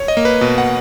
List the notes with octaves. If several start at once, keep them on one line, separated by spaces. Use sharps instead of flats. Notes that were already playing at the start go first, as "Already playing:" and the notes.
Already playing: C#5
D#5
A#3
B4
B2
F#5